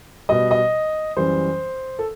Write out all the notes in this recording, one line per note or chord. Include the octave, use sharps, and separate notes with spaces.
B2 G3 D#5
D#5
F#2 E3 G3 C5
A4